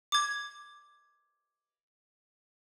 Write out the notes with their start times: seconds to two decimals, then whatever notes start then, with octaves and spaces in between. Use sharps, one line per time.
0.12 D6 G#6